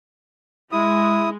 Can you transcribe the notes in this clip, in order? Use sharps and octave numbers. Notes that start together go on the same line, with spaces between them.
G#3 E4 D#6